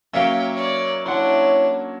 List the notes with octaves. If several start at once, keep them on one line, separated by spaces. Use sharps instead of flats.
F#3 A#3 C#4 C#5 E5 F5 G5
C#5 D5
D4 E4 C#5 F#5 C6